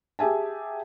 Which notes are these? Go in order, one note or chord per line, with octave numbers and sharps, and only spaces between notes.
G4 G#4 E5 G#5 A5